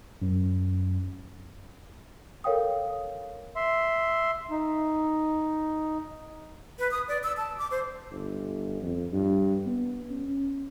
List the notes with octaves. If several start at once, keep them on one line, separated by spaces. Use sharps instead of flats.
F#2
A4 A#4 C#5 F5 G5 D#6
E5 C6
D#4
B4
D#6
D5
E6
A5
D6
C5
G1
F2
G2
B3
C#4